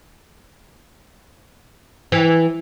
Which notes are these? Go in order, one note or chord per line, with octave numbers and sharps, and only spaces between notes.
E3